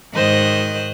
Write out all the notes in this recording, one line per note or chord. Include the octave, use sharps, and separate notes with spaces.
G#2 D#3 C5 D#5 F#6